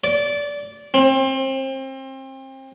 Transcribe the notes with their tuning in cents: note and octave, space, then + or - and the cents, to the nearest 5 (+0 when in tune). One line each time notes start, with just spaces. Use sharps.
D5 -20
C4 +30